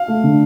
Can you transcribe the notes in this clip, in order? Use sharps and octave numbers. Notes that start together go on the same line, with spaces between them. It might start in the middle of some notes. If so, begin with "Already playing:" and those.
Already playing: F5
A3
D3